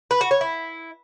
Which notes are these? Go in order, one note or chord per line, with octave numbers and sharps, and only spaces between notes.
B4
F#4
C#5
E4